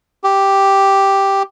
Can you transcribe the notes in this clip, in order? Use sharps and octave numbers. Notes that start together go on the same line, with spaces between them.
G4